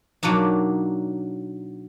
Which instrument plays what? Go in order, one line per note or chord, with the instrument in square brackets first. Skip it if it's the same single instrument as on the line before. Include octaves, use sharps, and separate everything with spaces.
[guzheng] B2 F#3 A#3 D4 D#4